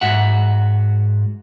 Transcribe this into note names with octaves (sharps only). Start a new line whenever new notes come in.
G#2 F#4 E5 F#5